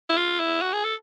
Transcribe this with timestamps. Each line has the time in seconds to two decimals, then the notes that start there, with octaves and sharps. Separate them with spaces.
0.09 E4
0.17 F4
0.40 E4
0.62 F#4
0.73 G#4
0.84 A4